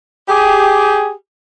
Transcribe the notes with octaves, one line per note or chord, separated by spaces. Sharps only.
G4 G#4